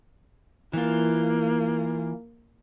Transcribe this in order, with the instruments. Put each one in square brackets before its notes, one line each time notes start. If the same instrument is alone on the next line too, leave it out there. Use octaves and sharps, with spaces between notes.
[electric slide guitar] E3 F4 [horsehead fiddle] A#3